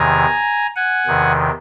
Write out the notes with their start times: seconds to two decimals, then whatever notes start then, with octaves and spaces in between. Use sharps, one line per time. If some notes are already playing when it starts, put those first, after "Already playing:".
Already playing: E2 C3 D#3 G#5 A#5
0.76 F#5 G#5
1.07 E2 C3 D#3